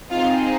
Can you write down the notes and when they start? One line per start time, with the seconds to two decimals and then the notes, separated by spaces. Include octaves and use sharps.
0.10 C4 D#4 F4 G#4 F5